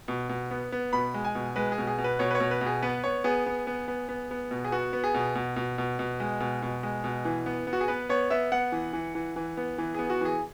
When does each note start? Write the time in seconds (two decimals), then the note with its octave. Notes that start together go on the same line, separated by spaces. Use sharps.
0.08 B2
0.29 B2
0.51 B3
0.72 B3
0.93 B2 B5
1.14 G#3
1.25 G#5
1.35 B2
1.56 G#3 B4
1.72 G#4
1.78 B2
1.87 G#4
1.98 B2
2.04 B4
2.19 B2 C#5
2.31 B4
2.35 C#5
2.40 B2
2.51 B4
2.61 B2
2.66 G#4
2.82 B3 B4
3.04 B3 C#5
3.24 B3 G#4
3.46 B3
3.67 B3
3.88 B3
4.09 B3
4.31 B3
4.51 B2
4.65 G#4
4.72 B3 F#4
4.93 B3
5.04 G#4
5.14 B2
5.35 B2
5.56 B2
5.78 B2
5.99 B2
6.20 G#3
6.40 B2
6.62 B2
6.83 G#3
7.04 B2
7.25 E3
7.46 B3
7.67 B3
7.73 F#4
7.81 G#4
7.88 B3 B4
8.09 B3 C#5
8.30 B3 E5
8.52 B3 F#5
8.72 E3
8.93 E3
9.15 E3
9.36 E3
9.57 B3
9.78 E3
9.95 B3 G#4
10.10 F#4
10.21 E3 G#4